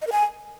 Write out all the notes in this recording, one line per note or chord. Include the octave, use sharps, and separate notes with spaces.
D#5
A#4
G#5